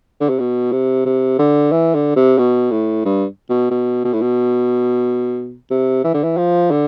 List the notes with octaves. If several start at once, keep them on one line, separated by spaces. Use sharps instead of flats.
D3
C3
B2
C3
C3
D3
E3
D3
C3
B2
A2
G2
B2
B2
B2
A2
B2
C3
E3
D3
E3
F3
D3